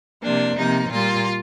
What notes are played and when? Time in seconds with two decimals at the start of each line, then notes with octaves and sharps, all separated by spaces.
0.22 C3 F3 A#3 D4
0.57 C3 F3 A#3 D#4
0.90 A#2 G3 A#3 F4